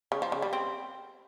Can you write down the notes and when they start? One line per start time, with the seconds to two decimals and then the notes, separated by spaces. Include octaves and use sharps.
0.12 C#3
0.22 F3
0.32 C#3
0.42 G3
0.53 C4